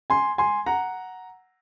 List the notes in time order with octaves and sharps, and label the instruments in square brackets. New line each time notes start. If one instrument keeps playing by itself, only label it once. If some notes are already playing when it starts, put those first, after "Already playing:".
[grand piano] G#5 C6
G#5 C6
F#5 A#5